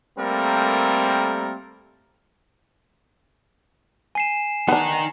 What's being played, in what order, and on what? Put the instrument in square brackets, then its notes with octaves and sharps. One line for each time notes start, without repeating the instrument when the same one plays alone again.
[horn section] G3 A3 A#3 C4 A4 A#4
[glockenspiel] G#5 C7 E7
[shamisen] B3 D4 [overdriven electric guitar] D#4 A#4